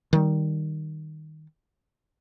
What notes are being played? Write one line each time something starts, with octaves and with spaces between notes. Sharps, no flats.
D#3 G3